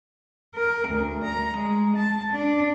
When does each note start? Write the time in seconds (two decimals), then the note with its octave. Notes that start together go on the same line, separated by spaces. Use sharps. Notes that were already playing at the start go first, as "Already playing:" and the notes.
0.55 A#4
0.88 D2
1.24 A#5
1.58 G#3
1.97 A5
2.33 D4